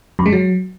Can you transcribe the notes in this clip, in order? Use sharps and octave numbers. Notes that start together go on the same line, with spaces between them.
F#2
G#3
F#3